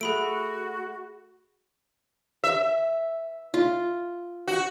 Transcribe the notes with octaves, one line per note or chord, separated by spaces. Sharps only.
A3 F#4 G#4 B5 D7
E5
F4
F#4